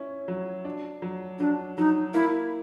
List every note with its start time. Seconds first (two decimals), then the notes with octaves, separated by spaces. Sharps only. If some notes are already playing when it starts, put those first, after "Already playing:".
Already playing: C#4 E4
0.28 F#3
0.65 D4
1.02 F#3
1.39 F#3 D4
1.78 F#3 D#4
2.14 A#3 E4